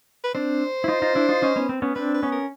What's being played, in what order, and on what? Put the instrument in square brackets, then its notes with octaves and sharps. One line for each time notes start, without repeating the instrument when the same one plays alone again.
[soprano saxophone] B4
[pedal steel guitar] C4 D4 [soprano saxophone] C5
[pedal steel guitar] E4
D#4 F4
D#4 F4
D4 E4
D#4 F4
C#4 D#4
B3 C#4
C4
B3 C#4
[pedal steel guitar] C4 D4 [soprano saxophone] B4
[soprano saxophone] B4
[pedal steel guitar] B3 C#4
[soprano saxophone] A#4